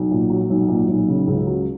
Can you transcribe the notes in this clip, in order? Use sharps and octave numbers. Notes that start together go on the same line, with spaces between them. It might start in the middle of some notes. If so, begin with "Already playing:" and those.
Already playing: B1
A#2
F#3
B1
A#2
B1
C#3
C#2
F#3